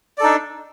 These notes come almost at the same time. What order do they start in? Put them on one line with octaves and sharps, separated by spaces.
D5 A4 D#4 D4